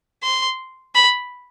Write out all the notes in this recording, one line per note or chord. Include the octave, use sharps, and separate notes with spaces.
C6
B5